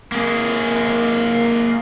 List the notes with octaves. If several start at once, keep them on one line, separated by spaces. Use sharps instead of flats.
A#3 G#4